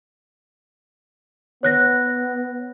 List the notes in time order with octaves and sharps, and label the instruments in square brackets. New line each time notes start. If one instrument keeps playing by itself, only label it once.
[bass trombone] B3 [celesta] C#5 F#6 A#6